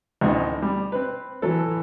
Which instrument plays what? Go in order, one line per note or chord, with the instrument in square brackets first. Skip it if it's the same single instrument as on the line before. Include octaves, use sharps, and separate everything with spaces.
[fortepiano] A1 D2 D#4
G3
C4 B4
[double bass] E3 [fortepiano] F#3 A4